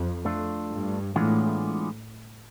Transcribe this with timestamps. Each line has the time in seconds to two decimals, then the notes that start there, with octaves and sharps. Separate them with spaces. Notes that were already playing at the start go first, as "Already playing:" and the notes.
Already playing: F2
0.25 A3 D4 F4
0.71 G2
1.16 A2 E3 G#3 B3 D4 F4